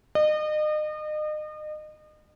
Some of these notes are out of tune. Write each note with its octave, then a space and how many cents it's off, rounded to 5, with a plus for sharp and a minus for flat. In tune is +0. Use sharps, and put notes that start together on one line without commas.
D#5 -35